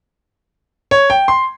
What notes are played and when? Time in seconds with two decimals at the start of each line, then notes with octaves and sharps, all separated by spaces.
0.91 C#5
1.10 G5
1.28 C6